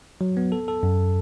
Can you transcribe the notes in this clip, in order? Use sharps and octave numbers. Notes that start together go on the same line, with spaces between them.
F#3
B3
A4
A4
F#2